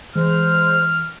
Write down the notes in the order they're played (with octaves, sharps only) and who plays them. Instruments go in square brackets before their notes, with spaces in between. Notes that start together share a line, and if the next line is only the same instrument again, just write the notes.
[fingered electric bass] E3 [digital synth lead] G#3 [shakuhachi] C5 [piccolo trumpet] F6